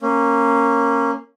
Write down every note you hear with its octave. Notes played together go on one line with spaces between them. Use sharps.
A#3 C#4